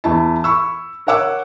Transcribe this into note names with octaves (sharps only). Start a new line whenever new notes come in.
E2 E4 A5
B5 C#6 E6
A#4 C#5 F#5 D6 E6